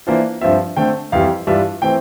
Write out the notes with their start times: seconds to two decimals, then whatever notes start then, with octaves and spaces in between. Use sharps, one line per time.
0.07 E3 A#3 D4 F4 C5
0.41 G2 F3 C4 F4 E5
0.77 D3 A3 C4 G5
1.12 F2 E3 G3 F5
1.47 G2 E3 G3 D4 F4 E5
1.82 E3 A3 C4 G5